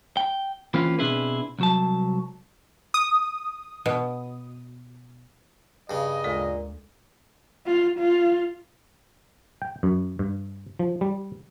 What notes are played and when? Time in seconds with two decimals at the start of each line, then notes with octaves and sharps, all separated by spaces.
0.17 G5
0.74 E3 A#3 C4 C#4 F4
0.99 B2 C4 D4 E4 G#4 B4
1.59 C2 F#3 A5
2.94 D#6
3.86 B2
5.90 G2 C#3 D#5
6.24 D2 A#2 G#3 A4
7.66 F4
7.99 F4
9.62 G5
9.83 F#2
10.19 G2
10.79 F3
11.01 G3